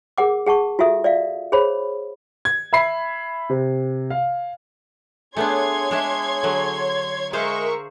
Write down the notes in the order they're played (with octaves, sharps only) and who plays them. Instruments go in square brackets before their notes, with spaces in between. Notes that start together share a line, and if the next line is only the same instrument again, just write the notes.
[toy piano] G#4 A#4 F#5 D6
G#4 F#5 A5 C#6
F4 F#4 A4 E5 D#6
D5 E5 F5
G#4 C5 C#5 B5
[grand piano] G#6
E5 B5 C7
C3
F5
[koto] A3 B3 D4 [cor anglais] G#4 [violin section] C#5 C6 G#6
[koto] G#3 D4 E5 [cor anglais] G#4
[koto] D3 F#3
[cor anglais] G#3 [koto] G#4 C5 F5 [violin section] A#4 E5 C#6